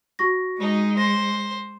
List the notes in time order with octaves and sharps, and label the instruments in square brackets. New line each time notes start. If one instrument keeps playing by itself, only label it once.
[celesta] F#4 C#6 A#6
[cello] G#3 [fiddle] D#4
[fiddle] C5 [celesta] A#6